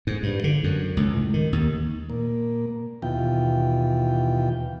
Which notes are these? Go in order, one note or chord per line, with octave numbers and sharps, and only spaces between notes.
G#2
G2
D3
F#2
C#2
A2
D#3
D#2
A#2 A#3
D#2 B2 E3 F4 G5